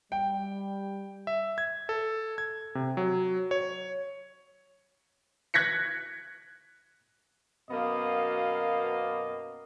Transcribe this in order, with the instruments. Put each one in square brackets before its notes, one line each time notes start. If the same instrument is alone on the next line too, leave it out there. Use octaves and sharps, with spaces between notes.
[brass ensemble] G3 [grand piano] G5
[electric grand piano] E5
G#6
A4
G#6
C3
F#3
C#5
[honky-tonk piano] F#6 G#6 A#6 B6 C#7
[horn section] F#2 B2 A#3 B3 D#5 F5